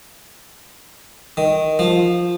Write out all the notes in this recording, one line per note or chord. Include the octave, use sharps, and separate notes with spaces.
D#3
F3